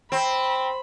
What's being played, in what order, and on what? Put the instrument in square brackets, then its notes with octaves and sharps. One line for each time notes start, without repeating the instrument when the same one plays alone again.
[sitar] C4 [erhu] B5